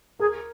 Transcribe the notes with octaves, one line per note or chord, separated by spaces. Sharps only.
G#4 A#4